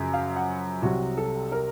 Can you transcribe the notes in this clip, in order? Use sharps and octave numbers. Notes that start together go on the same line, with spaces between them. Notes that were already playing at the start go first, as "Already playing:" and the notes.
Already playing: F#2 C#3 F3
F5
F#5
C2 C3 F#3 F#4
A4
A#4